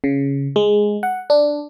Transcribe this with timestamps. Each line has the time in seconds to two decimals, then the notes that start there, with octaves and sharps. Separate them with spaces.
0.04 C#3
0.56 G#3
1.03 F#5
1.30 D4